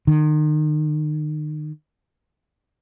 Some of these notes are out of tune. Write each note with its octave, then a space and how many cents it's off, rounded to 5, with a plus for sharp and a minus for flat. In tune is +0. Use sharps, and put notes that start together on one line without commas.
D#3 -35